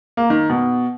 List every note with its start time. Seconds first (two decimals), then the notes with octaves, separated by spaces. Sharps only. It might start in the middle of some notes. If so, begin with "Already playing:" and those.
0.17 A#3
0.30 D#3
0.50 B2